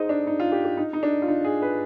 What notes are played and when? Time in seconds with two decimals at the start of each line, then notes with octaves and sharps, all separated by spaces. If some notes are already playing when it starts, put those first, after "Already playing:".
Already playing: D#4 G#4 C5 D#5
0.09 D4
0.27 D#4
0.39 F4
0.52 G4
0.64 G4
0.77 D#4
0.93 D#4
1.03 D4
1.22 F4
1.28 D#4
1.44 G#4
1.62 B4